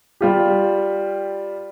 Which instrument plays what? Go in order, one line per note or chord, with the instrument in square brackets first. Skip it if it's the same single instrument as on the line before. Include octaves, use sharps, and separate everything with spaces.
[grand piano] G3 F4 G4